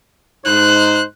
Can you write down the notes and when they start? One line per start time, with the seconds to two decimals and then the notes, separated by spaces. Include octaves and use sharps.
0.46 G#2 D#4 C5 F#6